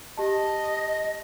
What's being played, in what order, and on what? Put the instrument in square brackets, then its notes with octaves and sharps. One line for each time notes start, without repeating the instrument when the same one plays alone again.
[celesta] G4 A5 [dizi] D#5